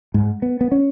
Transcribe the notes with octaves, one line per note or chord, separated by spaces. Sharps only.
G#2
B3
B3
C#4